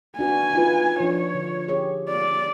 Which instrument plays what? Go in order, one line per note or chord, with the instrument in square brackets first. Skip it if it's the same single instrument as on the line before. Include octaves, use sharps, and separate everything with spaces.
[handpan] D4 F#4 B4 [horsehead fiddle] G#5
[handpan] D#4 F4 B4
[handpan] F3 D4 [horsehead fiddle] C#5
[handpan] D3
G4 G#4 C#5
[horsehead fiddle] D5